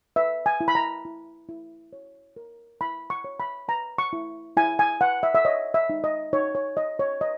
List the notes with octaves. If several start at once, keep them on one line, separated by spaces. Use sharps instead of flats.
B4 E5
G#5
E4
B5
A#5
E4
E4
C#5
A#4
E4 B5
C#6
C#5
B5
B4 A#5
C#6
E4
E4 G#5
G#5
B4 F#5
E5
E5
C#5 D#5
E5
D#4
D#5
D#4 C#5
C#5
C#5 D#5
C#5
B4 D#5